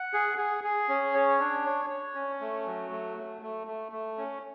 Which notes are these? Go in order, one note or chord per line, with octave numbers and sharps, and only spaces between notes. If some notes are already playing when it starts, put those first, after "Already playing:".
Already playing: F#5
G#4
G#4
G#4
C#4
C#5
D4
C#5
C#5
C#4
A3
F#3
A3
A3
A3
A3
A3
C#4